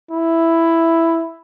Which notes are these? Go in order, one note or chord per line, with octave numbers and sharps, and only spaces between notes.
E4